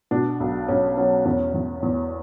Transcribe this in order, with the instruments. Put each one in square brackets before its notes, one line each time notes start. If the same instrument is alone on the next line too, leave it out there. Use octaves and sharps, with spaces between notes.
[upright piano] B2 D4
B1
B1 C#4
F#3 C#4
E2 C#4
E2
E2